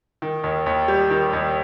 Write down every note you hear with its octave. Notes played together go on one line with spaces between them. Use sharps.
D#3
D#2
D#2
G3
D#3
D#2